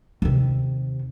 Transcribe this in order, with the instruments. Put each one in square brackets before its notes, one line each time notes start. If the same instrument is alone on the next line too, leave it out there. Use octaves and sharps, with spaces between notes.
[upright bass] D#2 C3